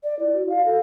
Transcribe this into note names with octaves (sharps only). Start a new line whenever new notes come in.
D5
E4
F#4
F5
A4